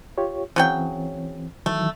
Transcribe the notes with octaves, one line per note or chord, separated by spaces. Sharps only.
F4 G4 C#5
C#3 E3 F#3 C4 G5
D#3 E3 F#3 A3